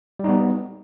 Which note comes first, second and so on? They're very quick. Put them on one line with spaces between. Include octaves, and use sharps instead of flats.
G3 D#4 B3